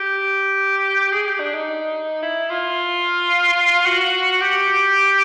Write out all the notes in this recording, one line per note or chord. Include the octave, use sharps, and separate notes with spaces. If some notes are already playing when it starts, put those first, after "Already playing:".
Already playing: G4
G#4
G4
D4
D#4
E4
F4
F#4
G4